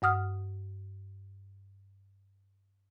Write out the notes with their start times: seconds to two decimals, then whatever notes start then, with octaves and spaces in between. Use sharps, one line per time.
0.02 G2 F#5 D#6 F6